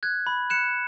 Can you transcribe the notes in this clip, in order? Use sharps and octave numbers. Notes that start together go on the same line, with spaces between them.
F#6 G#6
B5
F#6 C#7 E7